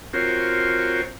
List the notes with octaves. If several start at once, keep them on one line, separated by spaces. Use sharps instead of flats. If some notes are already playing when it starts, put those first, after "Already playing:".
C4 F4 F#4 A#4 C5 C#5